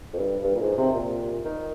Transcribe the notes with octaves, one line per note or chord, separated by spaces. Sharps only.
F2
G2
G2
A#2
G#2
C3
A#2
D#3